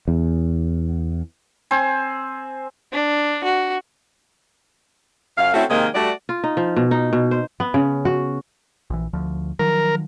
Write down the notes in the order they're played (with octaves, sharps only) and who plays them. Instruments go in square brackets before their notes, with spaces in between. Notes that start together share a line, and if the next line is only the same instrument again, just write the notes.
[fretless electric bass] E2
[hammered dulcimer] C4 C5 G#5
[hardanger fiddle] D4
F#4
[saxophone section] F#2 F5
A3 C4 C#4 E4 F#4 A4
C3 D#3 G#3 A#3 G#4 D#5
G3 A3 F#4 D5
[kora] F4
D#4
F3
B2
D#4
B2
C5
B3
C#3
F#4
[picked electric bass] A#1 E3
D2 F3
[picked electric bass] D#3 F3 F#3 [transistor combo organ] A#4